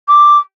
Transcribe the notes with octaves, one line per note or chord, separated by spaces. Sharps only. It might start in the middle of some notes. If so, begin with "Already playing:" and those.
D6